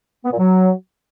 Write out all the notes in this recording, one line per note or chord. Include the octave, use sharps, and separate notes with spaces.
B3
A#2
F#3